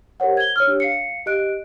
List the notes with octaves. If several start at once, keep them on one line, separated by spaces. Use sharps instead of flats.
G4 A#4 C5 C#5 F#5
G#6 G7
C#5 E6 F6
D4 G4 C#5
F5 C7 C#7
G4 D#5 F#6 D7